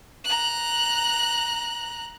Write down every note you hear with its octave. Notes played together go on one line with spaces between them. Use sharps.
A#5 F#6